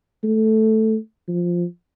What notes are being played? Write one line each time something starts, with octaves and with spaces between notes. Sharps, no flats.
A3
F3